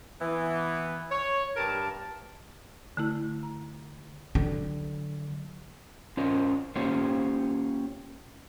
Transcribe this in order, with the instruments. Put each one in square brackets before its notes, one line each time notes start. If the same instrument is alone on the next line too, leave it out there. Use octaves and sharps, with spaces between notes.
[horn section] E3 B3
C#5
G2 A#4 A5
[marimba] D3 A3 E4
A#5
[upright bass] D3 F#3
[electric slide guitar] C#4 F4 A#4 C5 D#5
A#3 C#4 F4 G4 C5 C#5